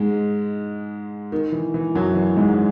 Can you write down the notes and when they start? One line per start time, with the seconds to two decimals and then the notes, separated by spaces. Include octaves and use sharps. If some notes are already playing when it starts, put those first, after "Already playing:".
Already playing: G#2 G#3
1.32 D#3
1.52 E3
1.74 E3
1.95 F#2 F#3
2.15 E3
2.36 G#2 G#3